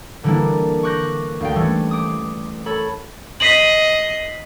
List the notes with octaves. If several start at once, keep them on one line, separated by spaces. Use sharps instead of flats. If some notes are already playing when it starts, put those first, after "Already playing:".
D3 E3 G3 A#3 D4 E4
C#6 D6 F#6 G6 A#6
D2 F5 G5
E3 G3 A3 C#4
C5 D6 D#6
A4 C#5 B5
D#5 B6 C7 F#7